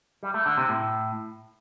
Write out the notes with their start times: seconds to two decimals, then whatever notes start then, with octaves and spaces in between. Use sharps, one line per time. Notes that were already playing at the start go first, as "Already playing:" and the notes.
0.23 G3
0.34 A3
0.46 D3
0.57 C3
0.69 A2